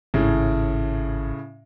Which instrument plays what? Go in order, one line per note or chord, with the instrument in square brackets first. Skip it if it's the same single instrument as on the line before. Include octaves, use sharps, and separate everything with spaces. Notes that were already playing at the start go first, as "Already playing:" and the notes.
[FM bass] G#1 [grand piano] A2 C#3